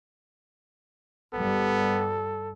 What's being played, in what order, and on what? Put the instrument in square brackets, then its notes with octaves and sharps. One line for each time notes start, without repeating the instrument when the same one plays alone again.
[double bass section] G1 G2 G3 [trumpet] B3 [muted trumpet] A4